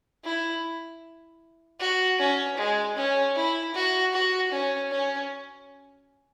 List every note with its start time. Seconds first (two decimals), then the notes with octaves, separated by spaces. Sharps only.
0.25 E4
1.80 F#4
2.19 C#4
2.58 G#3
2.96 C#4
3.36 E4
3.74 F#4
4.13 F#4
4.52 C#4
4.91 C#4